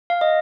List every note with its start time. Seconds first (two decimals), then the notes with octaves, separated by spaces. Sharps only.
0.10 F5
0.21 D#5